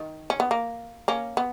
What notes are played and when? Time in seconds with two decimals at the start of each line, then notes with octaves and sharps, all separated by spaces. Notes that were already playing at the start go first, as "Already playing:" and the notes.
Already playing: D#3
0.30 C#4
0.40 B3
0.51 A#3
1.08 A#3 C#4
1.37 B3